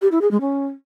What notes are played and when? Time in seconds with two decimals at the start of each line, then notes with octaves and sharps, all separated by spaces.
0.02 G4
0.12 E4
0.21 G#4
0.31 G#3
0.41 C#4